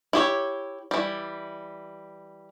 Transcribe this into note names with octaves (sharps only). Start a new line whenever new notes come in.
E4 G4 C#5
E3 G3